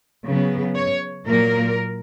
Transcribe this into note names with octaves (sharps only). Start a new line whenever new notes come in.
C#3 F#3 B3
C#5
A#2 F#3 A#3 A#4